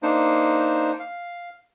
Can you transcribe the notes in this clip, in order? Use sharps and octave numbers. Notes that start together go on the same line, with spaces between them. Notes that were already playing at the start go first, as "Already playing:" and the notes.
A#3 D4 D#4 C5
F5